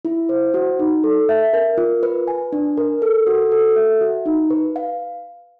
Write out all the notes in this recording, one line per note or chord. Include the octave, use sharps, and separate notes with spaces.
E4
C5
F#4
D#4
A4
E5
A#4
F4
B4
G#5
D4
A#4
A4
F#4
A4
E5
F#4
D#4
B4
F5